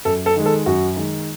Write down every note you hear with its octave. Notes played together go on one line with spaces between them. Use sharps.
F#2 A4
A4
D#3 G#3
A4
F#2 F#4
D#3 G#3